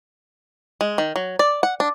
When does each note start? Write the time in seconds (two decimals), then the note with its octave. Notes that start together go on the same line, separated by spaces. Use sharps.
0.81 G#3
0.98 D#3
1.16 F#3
1.39 D5
1.63 F#5
1.80 D4